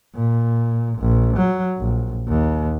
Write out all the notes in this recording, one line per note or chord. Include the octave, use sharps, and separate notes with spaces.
A#2
A#1
F#3
A#1
D#2